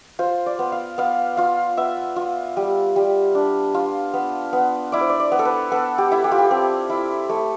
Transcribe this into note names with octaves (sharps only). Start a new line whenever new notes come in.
F4 C5
D5
B3
F5
B3 F5
F4 F5
B3 E5
F4
G3
G3
D4
F4
B3
B3
E4 D5
C5
D5
D5
B3
A4
B4
B3 A4
G4
E4
G4
F4
G4
C4
E4
A3